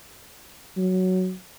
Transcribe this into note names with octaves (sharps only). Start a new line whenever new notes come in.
F#3